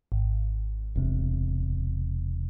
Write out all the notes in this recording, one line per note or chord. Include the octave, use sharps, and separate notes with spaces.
G#1
E1 C3